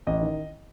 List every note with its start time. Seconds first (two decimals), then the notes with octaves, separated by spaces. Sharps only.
0.07 A1 D#5
0.21 D#3